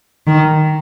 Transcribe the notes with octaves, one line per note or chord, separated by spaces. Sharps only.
D#3